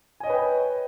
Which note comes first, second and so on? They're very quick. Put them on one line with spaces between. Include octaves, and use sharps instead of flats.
G#5 D#5 C#5 B4 G5